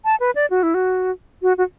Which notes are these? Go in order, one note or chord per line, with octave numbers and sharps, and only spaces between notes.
A5
B4
D5
F#4
E4
F#4
F#4
F#4